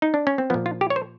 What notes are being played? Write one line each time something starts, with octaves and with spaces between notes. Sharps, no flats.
D#4
D4
C#4
C4
A#2 F3 B3
F4
G4
C#5
C5